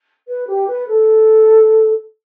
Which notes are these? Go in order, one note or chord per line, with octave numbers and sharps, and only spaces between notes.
B4
G4
B4
A4